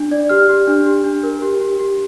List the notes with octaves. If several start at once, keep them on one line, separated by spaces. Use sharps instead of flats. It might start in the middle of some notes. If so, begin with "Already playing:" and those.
Already playing: D4
D5
G4 F6
G4
D4
G4
D4
A#4
G4
G4
G4